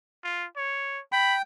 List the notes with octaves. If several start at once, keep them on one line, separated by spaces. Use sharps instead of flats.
F4
C#5
G5 B5